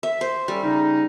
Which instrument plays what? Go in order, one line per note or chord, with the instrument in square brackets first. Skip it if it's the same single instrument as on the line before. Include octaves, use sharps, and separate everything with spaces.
[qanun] E5
C5
[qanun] G3 [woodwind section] C#4 A4
[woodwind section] C#3 C#4 D#4